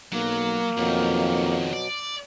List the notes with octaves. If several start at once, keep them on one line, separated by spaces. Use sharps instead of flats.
B1 F#3 A#3
B1 F2 B2 D#3 F#3
D5